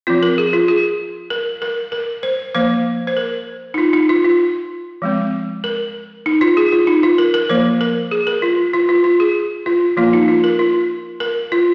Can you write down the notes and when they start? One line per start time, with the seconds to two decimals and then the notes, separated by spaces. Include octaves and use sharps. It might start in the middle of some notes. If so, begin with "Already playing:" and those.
0.07 F3 C4 F4
0.23 A#4
0.38 G#4
0.53 F4
0.68 G#4
1.30 A#4
1.62 A#4
1.92 A#4
2.23 C5
2.55 F3 A#3 C5
3.07 C5
3.17 A#4
3.74 D#4
3.78 F4
3.93 D#4
4.09 F4
4.25 F4
5.02 F3 G#3 C4
5.64 A#4
6.26 D#4
6.41 F4
6.57 G#4
6.72 F4
6.87 D#4
7.03 F4
7.18 A#4
7.34 A#4
7.49 F3 A#3 C5
7.81 A#4
8.11 G#4
8.27 A#4
8.42 F4
8.74 F4
8.89 F4
9.04 F4
9.20 G#4
9.66 F4
9.97 F3 A#3 F4
10.13 D#4
10.28 F4
10.44 A#4
10.59 F4
11.20 A#4
11.52 F4